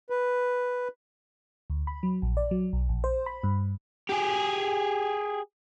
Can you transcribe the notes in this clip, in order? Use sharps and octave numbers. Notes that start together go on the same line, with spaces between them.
B4
D2
B5
F#3
A#1
D5
F#3
B1
A#1
C5
B5
G2
G4 G#4